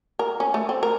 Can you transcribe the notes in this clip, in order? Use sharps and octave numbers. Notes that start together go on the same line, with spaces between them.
A#4
C#4
A3
C4
A#4